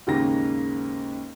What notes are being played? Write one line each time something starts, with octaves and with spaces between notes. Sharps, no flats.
D#2 G#2 C#3 A#3 G4 A#6